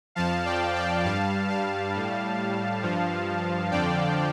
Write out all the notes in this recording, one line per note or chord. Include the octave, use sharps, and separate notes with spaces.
F2 F3 F5 A5
D5 G5
D5 G5
G2 G3 F5 A5
F5 A5
A2 G3
G2 F3
F2 D3 F3 D5 G5